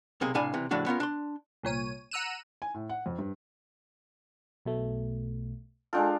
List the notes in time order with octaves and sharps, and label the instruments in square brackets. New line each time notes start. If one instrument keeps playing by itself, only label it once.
[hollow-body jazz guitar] B1 C3 A#3 G#4
A2 C3 D4 F5 G#5 B5
C3 E3
A2 C#3 F3 A3 D4 F#4
B3 C#4 F4 A#4
D4 C6
[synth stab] C2 A#2 C#5 D#7
F#5 A#5 E6 F#6 D#7 E7
[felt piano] G#5
A2
F#5
F2
G2
[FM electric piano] B1 B2 A3
[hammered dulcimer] G#3 D4 F4 [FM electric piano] A4 G5